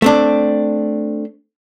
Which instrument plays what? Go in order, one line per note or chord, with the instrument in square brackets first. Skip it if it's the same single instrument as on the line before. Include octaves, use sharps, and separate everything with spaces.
[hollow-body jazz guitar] A3 C4 D4